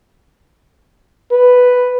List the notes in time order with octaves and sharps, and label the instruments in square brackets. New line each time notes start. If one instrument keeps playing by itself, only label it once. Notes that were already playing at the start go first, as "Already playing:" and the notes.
[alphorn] B4